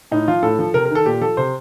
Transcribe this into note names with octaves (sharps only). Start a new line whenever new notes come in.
A2 D#4
F3 F4
A2 A4
F3
C3 A#4
A#4
D#3 A4
A#2 G4
F3 A4
C3 C5